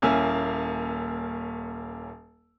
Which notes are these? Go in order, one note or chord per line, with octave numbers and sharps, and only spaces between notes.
D#1 A#3 C#4 E4 G#5 E6